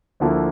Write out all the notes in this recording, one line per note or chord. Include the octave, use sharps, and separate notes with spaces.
D2 D3 F3 A#3 E4